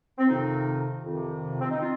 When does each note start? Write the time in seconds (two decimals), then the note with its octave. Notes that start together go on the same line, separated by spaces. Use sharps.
0.18 C4
0.27 F2 C3 D#3 D#4
1.04 F2 C3 D#3
1.60 C4
1.70 D#4
1.80 C4 F4